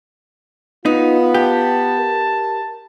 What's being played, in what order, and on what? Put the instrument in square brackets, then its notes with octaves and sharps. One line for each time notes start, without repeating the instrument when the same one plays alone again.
[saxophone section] B3 [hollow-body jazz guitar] D#4 [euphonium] F4
[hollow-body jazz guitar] G4 [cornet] A5
[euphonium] A#4